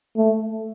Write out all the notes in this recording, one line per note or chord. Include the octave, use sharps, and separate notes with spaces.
A3